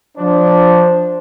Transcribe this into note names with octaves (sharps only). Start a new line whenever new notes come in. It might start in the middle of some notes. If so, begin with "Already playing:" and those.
F3 D4 C5